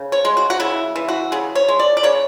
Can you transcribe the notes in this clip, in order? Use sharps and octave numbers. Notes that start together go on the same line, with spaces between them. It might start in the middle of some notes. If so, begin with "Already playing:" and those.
Already playing: C#3
C#5
G#3
F#4
F#4
C#3 E4
E3
F#4
C#3 G#4
C#5
G#3
D5
D5
C#3 C#5